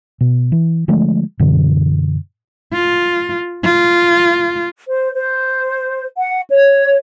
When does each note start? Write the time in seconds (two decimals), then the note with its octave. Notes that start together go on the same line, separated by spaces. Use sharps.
0.21 B2
0.52 E3
0.88 D3 F3 G#3 A3
1.39 F#2 B2 D3 E3
2.73 F4
3.64 F4
4.89 C5
5.15 C5
6.17 F#5
6.50 C#5